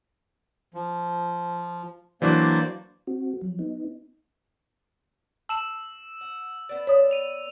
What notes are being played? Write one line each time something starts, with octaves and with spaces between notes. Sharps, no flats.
F3
E3 F#3 A#3 D4 C5 D5
C4 F#4
F3 F#3
B3 D#4
A5 E6 E7 F#7
F#5
B3 D5
C#5 D#6
D#7 F7